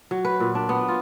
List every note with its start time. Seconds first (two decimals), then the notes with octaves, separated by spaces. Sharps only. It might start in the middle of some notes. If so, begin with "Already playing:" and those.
0.11 F#3
0.25 B4
0.40 A#2
0.55 D4
0.69 B3
0.88 F4